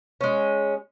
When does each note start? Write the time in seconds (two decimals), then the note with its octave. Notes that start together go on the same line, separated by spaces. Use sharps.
0.21 G#3 C#4